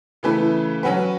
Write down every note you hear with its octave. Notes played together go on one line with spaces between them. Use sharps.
C#3 E3 A3 E4 B4
F#3 C#4 F#4 B4